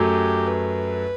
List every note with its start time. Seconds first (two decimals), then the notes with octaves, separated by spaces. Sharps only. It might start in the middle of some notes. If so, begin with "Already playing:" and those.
Already playing: F#2 F#3 A3 G4
0.47 B4